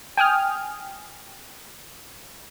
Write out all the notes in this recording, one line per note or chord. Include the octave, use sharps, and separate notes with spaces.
G5 G#5 D#6 F6